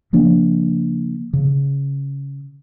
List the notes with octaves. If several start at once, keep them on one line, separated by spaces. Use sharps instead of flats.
C#3 F3 A#3 D4
C#3